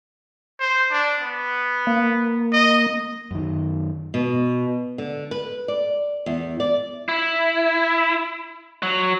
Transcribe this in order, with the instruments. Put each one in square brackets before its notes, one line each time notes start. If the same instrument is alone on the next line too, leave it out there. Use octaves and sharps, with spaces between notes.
[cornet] C5
D4
B3
[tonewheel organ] A#3
[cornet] D#5
[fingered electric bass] F#2 D#3
[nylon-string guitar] B2
D3
B4
D5
E2
D5
[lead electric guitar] E4
F#3